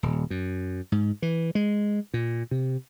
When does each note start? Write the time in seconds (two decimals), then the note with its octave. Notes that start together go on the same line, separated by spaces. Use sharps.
0.03 D#1
0.30 F#2
0.92 G#2
1.22 E3
1.55 G#3
2.14 A#2
2.51 C3